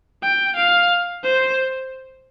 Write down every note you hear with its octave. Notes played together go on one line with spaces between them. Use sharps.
G5
F5
C5